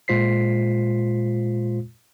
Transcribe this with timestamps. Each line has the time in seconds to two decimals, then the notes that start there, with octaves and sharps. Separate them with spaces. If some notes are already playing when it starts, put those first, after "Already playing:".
0.08 A#2 G#3 F4 C5 B6 C7